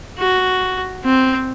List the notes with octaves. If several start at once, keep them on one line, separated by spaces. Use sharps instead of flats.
F#4
C4